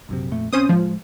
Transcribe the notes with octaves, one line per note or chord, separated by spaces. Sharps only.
A#1 F#2 C3
F2 A#2 A3
B1 C4 C#4 C5 D#6
A2 F3 G#3